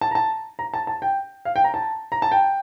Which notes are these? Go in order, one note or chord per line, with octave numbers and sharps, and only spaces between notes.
A5
A#5
A5
A#5
A5
A5
G5
F5
G5
A#5
A5
A#5
A5
G5